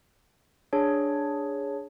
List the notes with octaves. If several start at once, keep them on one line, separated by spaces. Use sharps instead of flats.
D4 G#4 C#5